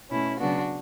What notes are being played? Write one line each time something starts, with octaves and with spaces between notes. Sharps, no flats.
B2 A3 C#4 E4
C#3 F#3 B3 D4 F#4